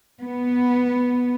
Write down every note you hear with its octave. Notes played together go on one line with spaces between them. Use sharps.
B3